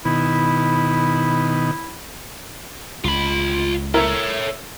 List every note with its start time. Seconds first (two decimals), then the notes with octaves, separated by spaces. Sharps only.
0.05 B2 D#3 E4
3.04 C#2 F4 B5
3.94 E4 A4 A#4 C#5